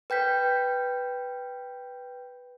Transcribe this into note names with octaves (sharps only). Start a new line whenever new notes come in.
B4 G5 G6 B6